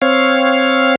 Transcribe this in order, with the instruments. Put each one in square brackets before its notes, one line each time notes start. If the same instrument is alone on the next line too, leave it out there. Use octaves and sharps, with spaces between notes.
[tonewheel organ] C4 C#5 F5